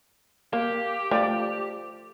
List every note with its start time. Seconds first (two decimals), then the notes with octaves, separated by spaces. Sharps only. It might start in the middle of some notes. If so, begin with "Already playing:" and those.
0.53 A#3 G4
1.11 F3 A3 D5 G5